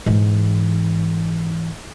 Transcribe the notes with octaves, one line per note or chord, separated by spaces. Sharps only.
G#2 E3